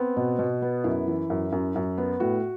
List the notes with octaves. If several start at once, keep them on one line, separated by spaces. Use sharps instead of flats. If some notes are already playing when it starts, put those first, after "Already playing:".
Already playing: B3 C4
B2
B2
B3
F#2 E4
E3
F#2
F#2
F#2
B3
A2 F#4